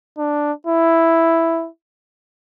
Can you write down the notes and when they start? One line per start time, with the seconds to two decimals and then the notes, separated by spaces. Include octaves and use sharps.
0.18 D4
0.67 E4